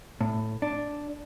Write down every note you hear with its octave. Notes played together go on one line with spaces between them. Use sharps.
A2
D4